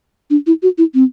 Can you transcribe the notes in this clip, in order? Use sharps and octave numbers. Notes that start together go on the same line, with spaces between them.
D4
E4
F#4
E4
C4